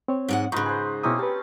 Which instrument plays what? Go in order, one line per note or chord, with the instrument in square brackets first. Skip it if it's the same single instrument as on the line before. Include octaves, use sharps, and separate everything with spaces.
[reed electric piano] C4 C#5
[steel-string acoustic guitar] G#2 G#3 F#5
[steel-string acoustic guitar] G#2 C#3 [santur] D#4 F4 B4 [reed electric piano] C#6 F#6
[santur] G#4 C5
[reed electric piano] B2 E4 D#6 [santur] A#3 C4 C#4
[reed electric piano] G4 B4 [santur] A5